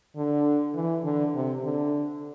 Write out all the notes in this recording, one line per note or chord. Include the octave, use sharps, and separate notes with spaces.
D3
E3
D3
C3
D3